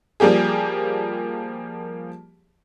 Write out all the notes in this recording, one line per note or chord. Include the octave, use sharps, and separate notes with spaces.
F3 G3 A#3 G4 G#4